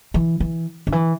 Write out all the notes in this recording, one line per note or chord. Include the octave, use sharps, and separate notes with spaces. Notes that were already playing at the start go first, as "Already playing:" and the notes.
E3
E3
D3
E3